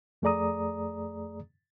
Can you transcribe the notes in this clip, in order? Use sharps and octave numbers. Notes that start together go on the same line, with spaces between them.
F2 A3 G#4 D5 A#5 D#6